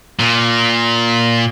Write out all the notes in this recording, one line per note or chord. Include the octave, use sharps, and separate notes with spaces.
A#2